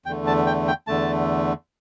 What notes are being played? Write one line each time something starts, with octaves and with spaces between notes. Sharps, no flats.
E2 D3 A3 G5
A5
G5
G5
E2 D3 A3 A5